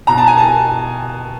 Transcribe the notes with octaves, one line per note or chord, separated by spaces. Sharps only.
B2 A#5
A5
G#5
A5